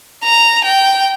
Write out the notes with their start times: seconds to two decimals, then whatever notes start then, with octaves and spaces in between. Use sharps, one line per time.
0.24 A#5
0.65 G5